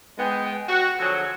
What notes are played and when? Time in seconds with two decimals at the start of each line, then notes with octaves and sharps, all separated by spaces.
0.18 G#3 B3 G5
0.69 F#4
0.99 D3 F3 F#3 F#4 G#4